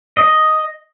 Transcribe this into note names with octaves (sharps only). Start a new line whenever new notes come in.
D#5